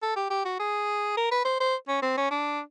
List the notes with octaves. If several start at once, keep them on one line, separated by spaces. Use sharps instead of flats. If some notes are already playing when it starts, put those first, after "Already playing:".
A4
G4
G4
F#4
G#4
A#4
B4
C5
C5
C#4
C4
C#4
D4